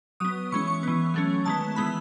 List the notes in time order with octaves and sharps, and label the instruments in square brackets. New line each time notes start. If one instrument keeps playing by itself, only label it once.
[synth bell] F#3 B3 D#6
E3 G#3 C#4 C#6
C#6
E3 B3
F#3 A3 C#4
D#3 G#3 B3 A5
E3 G#3 B3 B5